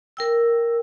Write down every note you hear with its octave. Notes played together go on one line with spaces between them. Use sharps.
A#4 G5 E6